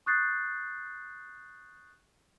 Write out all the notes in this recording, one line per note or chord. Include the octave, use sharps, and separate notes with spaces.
C#6 D#6 F#6 G6 A6 C7